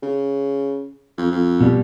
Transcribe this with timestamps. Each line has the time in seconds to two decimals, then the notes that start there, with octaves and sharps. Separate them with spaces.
0.02 C#3
1.18 F2
1.32 F2
1.61 B2 G3